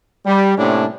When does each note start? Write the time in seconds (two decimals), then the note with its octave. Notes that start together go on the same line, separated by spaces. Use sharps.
0.24 G3
0.57 A2 C3 A#3 C#4 D4